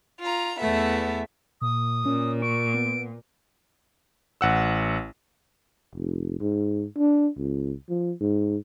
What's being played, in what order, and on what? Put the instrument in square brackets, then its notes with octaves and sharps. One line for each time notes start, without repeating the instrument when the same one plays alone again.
[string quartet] F4 A#5
E2 A3 B3 E5
[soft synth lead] A#2 [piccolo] D#6
[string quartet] A#2 [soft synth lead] C#4
[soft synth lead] C#6 [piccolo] D7
[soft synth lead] B3
[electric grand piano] A1 F#5 E6
[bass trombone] F1
G#2
D4
C#2
F3
G#2